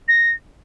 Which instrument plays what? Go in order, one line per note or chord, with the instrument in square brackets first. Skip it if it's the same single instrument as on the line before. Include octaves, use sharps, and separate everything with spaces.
[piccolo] A#6